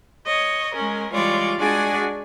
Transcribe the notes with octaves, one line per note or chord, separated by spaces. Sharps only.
C#5 D#5
G#3 C#4 A#4
E3 G3 G#3 F4 C#5 D5
G#3 D4 F#4 G#4 D5 G#5